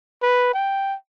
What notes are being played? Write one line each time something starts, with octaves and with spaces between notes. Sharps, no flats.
B4
G5